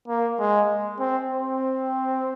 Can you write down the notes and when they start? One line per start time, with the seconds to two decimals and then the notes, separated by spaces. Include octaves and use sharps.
0.08 A#3
0.39 G#3
0.99 C4
1.29 C4